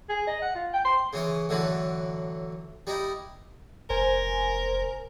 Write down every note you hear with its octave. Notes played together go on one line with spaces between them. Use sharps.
G#4
D#5
F#5
F4
G5
C6
C#3 E3 C#4
A2 D3 E3 F#3
G3 D#4 E4
F1 A#4 C5 G#5